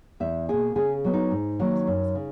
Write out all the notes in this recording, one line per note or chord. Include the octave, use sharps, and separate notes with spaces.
E2 E5
B2 A#3 G#4
C#3 G#4
F#3 B3
D#4
G#2
D#3 F#3 A#3
F#2
C#3